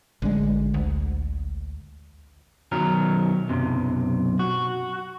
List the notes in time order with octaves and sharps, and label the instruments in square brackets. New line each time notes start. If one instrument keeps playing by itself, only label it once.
[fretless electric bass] A1 G#3 [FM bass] D3
[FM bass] D2
[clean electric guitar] B1 D#3 F#3 A#4
B1 F#2 C3
F#4